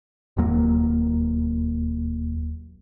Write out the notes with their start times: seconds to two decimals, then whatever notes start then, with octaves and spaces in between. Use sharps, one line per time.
0.37 E1 D#2 F#3 A#3